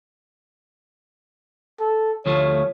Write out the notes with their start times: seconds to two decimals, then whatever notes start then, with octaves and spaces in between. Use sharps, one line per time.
1.80 A4
2.26 D2 F3 A3 C#5